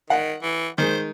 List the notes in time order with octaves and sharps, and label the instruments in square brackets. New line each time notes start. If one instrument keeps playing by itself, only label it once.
[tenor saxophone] D#3 [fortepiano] F#5
[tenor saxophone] E3
[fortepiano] D#3 G#3 [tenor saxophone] C5